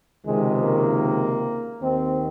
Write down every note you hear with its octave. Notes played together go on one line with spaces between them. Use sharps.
C#2 C3 D#3 G#3
A#3
D#2 D#3 C4